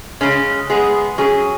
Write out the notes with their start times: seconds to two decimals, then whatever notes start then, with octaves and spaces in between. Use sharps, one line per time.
0.21 C#3 G#3 C#4
0.70 G#3 B3 G#4
1.18 F#3 C#4 G#4